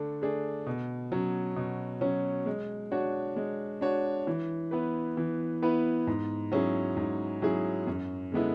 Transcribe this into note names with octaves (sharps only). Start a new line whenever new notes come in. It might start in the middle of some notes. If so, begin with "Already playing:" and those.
Already playing: D3 A3 D4
A3 D4 G#4
B2
F#3 C#4
B2
F#3 C#4
G#3
D4 F#4 C#5
G#3
D4 F#4 C#5
E3
B3 E4 B4
E3
B3 E4 B4
G#2
F#3 C#4 E4 G#4
G#2
F#3 C#4 E4 G#4
F#2
D3 G#3 B3 E4